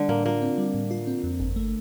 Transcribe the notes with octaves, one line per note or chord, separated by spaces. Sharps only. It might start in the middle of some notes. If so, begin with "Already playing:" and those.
Already playing: D3 G3
A2 A#3
A#3 F4
C4
G3
A2
F4
C4
F2
G1
A3